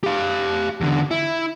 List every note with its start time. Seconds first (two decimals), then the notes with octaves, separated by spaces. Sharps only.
0.04 G4 F5
0.81 E2 D3
1.11 E4